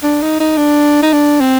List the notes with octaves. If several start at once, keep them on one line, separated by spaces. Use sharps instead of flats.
D4
D#4
D#4
D4
D#4
D4
C4